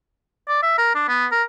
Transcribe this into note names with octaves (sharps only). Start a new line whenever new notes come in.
D5
E5
A#4
D4
B3
A#4